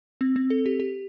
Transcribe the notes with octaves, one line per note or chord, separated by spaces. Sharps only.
C4
C4
A4
G4
G4